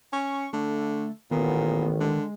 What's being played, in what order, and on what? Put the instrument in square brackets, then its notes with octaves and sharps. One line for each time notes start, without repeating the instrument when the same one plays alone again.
[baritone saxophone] C#4 [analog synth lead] C#6
[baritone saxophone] D3 [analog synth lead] A3
[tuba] A1 [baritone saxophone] A#2 [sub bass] D#3 [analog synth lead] B3
[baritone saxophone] D3 [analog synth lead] G#3